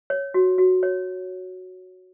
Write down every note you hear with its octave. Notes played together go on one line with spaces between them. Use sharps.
C#5
F#4
F#4
C#5